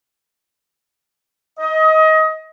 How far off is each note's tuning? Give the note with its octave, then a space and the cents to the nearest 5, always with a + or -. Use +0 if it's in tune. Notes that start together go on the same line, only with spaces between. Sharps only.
D#5 +25